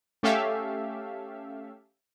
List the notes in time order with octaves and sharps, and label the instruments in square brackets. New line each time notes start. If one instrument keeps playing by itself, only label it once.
[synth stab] A3 C#4 G4 A4 E5 F5